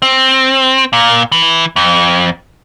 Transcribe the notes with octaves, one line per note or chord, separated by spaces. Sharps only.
C4
A#2
E3
F2